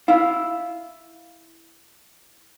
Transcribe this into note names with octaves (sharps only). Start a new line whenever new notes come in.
E4 F5